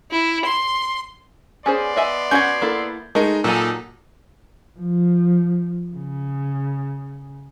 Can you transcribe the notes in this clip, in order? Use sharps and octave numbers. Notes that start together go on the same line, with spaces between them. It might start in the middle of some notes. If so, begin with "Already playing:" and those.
E4
C6
B3 C#4 G#4 C5 D5 C6
D#5 E5 G#5
C#4 F#4 F#5 G6 G#6
A#3 E4 A4
G#3 A3 D#4 A#4
A#2 F#3 D#4 A4 G#5
F3
C#3